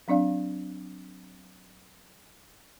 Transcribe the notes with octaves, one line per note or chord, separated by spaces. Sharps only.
F#3 C4 D4 D5 F5